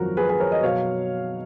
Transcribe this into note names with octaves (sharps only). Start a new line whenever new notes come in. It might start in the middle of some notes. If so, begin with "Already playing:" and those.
Already playing: G#1 F#2 F3 F#4 A#4
G#4 B4
G#4 B4
A#4 C#5
B4 D#5
B2 F#3 C#5 F5